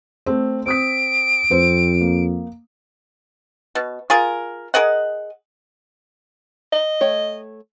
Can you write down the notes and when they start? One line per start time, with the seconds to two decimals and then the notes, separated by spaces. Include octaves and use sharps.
0.26 A3 C4
0.66 C4 D#6 B6 D7
1.51 F2 C4 C5
2.01 A#3
3.75 B2
4.10 F4 G#4 A#4
4.74 G#4 A#4 D#5 F#5
6.73 D#5
7.01 A3 C#5 G5